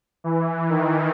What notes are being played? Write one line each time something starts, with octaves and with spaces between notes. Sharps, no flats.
E3
D#3